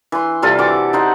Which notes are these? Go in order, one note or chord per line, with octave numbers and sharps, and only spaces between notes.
E3 C6
C3 G3 F4 A4
E3 F#4 D6
D#4 C5 F#5